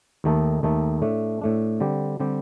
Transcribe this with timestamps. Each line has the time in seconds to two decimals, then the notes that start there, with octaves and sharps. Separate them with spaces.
0.24 D#2 D#3 A3 D#4 A4
0.63 D#2 D#3 A3 D#4 A4
1.02 A2 A3 D4
1.42 A2 A3 D4
1.80 D3 G3 C4 G4
2.20 D3 G3 C4 G4